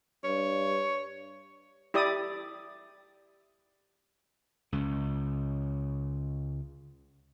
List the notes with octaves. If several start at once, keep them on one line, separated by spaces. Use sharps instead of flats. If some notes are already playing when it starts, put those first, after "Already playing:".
G2 C#5
E4 G4 D5 D#6
C#2 C#3